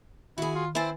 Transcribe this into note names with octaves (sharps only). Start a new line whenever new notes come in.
D#3 E4 F#4 G#4 B5
F4
C4 E4 B4 C5 G#5 A6